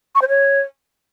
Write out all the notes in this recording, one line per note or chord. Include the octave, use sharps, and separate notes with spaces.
C#6
C5
C#5